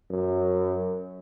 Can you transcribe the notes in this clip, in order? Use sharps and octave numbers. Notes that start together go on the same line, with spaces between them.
F#2